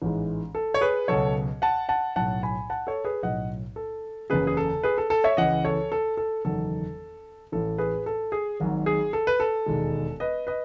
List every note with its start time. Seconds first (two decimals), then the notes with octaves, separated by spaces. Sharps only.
0.02 A1 G#2 E3 G#3
0.55 A4
0.74 C#5
0.81 G#4 B4
1.08 C#2 B2 F#3 A4 C#5
1.62 F#5 A5
1.89 F#5 A5
2.16 B1 A2 F#3 F#5 A5
2.43 G#5 B5
2.70 F#5 A5
2.87 A4 C#5
3.05 G#4 B4
3.23 B1 A2 F#3 D#5 F#5
3.76 A4
4.30 F#1 E2 C#3 G#4 B4
4.47 G#4
4.57 A4
4.83 G#4 B4
4.98 A4
5.10 A4
5.24 C#5 E5
5.37 C#2 C#3 E3 D#5 F#5
5.65 A4 C#5
5.92 A4
6.17 A4
6.45 F#1 E2 D#3 F#3 A4
7.52 A1 A2 E3 A4
7.78 G#4 B4
8.06 A4
8.32 G#4
8.60 G#1 G#2 D#3 F#3
8.86 G#4
9.13 A4
9.27 B4
9.40 A4
9.66 E1 D#2 D#3 G#3
10.20 B4 D#5
10.47 B4 D#5